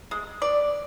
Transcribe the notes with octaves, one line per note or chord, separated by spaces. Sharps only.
G#3
D5